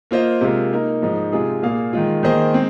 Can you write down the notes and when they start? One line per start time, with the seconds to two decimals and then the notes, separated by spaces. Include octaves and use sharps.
0.11 A#3 F4 C5 D#5
0.41 C3 G#3 F4 A#4
0.72 A#3 D#4 A#4
1.02 G#2 F3 G#3 D#4
1.32 C3 G#3 F4 G#4
1.62 A#2 A#3 G#4 F5
1.93 D#3 G#3 F4
2.23 D#3 A#3 G#4 C5 D#5
2.54 G#3 C4